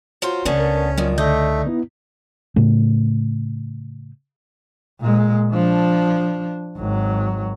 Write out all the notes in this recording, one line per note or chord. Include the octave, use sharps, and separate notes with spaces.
F#3 F4 C5
C#2 D3 A3 B3 C#4 D4
A#4
F2 A#2 D#3 F#3
D3 A3 D#4 D5 D#5 G6
B3 E4
A2 C#3 A3
A#2 G#3
F3 D4
G#1 F#3